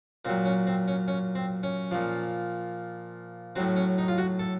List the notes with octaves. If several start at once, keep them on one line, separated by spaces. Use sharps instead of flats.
A#2 F#3 C4
C#4
C4
C#4
C#4
C4
C#4
A#2 F3
A2 F#3 C4
C#4
D#4
F4
F#4
A4